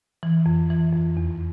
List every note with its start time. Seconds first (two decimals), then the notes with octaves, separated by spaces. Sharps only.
0.23 E3
0.46 F2
0.70 E3
0.93 F2
1.17 E2